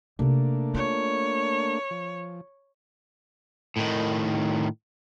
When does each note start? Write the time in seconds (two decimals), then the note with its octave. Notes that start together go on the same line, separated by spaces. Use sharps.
0.19 C3 A3 A#3 D4 D#4
0.75 F4 C#5
1.91 F3
3.77 A2 D#3